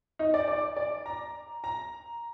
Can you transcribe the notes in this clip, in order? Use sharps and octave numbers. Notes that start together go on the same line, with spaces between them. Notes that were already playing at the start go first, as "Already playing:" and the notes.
D#4
D5
D5
D5
A#5
A#5